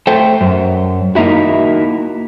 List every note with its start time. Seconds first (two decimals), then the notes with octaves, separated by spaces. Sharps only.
0.07 A3 A4 C5 G5
0.41 F#2
1.15 A#3 D#4 E4 F#4